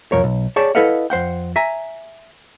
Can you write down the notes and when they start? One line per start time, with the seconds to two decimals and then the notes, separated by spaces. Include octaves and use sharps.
0.12 B1 F2 A#4 C#5
0.24 B1
0.56 G#4 C#5 D5 G5 A5
0.75 E4 A4 B4 D#5 F5 F#5
1.10 F2 C5 F#5 G5
1.56 E5 G#5 A#5